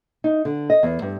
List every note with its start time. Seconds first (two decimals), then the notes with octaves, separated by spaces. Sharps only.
0.24 D#4
0.45 D3
0.70 D#5
0.83 E2
1.02 G2